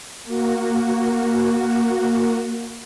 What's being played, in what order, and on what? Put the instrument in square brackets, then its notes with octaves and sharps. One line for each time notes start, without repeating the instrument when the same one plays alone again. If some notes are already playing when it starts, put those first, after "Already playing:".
[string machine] A#3 F#4